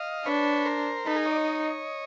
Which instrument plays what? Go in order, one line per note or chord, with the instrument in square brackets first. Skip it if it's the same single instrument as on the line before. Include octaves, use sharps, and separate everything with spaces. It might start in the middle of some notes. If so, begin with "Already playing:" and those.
Already playing: [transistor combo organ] D#5 F5
[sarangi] D4 [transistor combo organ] B4 C#5
[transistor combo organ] A#4 C5
[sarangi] D#4 [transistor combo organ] A4 B4
[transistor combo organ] G#4 A#4
C#5 D#5
D5
C#5 D#5